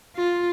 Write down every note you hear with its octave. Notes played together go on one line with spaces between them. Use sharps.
F4